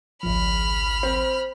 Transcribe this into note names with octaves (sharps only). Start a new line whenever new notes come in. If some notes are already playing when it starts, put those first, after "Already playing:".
G#1 C#2 F3 B5 F6
C4